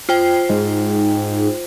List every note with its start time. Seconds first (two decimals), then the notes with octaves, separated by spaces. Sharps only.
0.09 F4 C5 G5
0.49 G#2